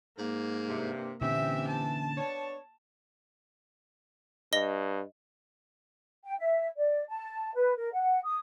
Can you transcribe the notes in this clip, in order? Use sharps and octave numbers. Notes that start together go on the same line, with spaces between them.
G#2 A#3
G2 C3
A#2 D3 E3 C4 C#4 G4 E5
A5
B3 D4 C#5
G2 D#5 A#6 G7
G5
E5
D5
A5
B4
A#4
F#5
D#6